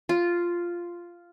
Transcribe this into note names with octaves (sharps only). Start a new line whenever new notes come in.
F4